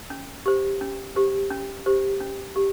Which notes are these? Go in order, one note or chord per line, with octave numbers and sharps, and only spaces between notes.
C#4
G4 C5
C#4
G4 C5
C#4
G4 C5
C#4
G4